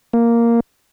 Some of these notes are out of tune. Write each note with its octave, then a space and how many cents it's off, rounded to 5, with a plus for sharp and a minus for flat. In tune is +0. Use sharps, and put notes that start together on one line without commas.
A#3 +0